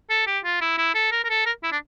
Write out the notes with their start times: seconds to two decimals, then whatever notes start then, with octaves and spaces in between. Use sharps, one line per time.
0.10 A4
0.27 G4
0.44 F4
0.61 E4
0.78 E4
0.95 A4
1.12 A#4
1.24 A#4
1.29 A4
1.46 A#4
1.63 E4
1.72 D4